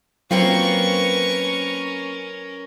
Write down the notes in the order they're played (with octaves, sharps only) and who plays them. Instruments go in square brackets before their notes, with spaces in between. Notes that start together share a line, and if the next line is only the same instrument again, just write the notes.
[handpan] F#3 [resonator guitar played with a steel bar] A#3 C4 F4 [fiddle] C#4 A#4 [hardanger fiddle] B4 C#6